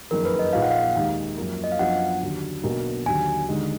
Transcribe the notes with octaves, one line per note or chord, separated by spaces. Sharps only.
F#1 F2 D#3 A#4
B4
D#5
A#1 A#2 F3 A#3 D#4 F5
F#5
F5
D#2 D#3 G#3 D#4
F#2 F3 A#3
D#5
F5
F#2 F3 B3 D4 F#5
D#2 D3 F#3 D4
B1 B2 A#3 D4
D#2 D3 F#3 G#5
D#2 D3 G#3 D#4